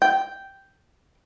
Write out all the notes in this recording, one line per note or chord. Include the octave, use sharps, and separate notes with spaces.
G5